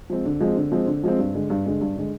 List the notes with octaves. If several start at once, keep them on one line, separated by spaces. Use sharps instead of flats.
F3 G#3 C4
D3
F3 G#3 C4
D3
F3 G#3 C4
D3
F3 G#3 C4
G2
D3 G#3
G2
D3 G#3
G2
D3 G#3